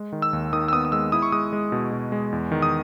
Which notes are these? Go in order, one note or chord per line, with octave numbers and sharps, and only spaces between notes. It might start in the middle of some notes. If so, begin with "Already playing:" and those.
Already playing: G#3
D#3
E6
D#2
D#3 D#6
E6
B3 D#6
D#6
G#3 E6
E4 D#6
C#6
G#3 D#6
G#3
B2
B2
G#3
E2
D#3
D#6